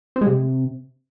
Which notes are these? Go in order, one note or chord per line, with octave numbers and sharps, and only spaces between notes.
C4
G#3
C3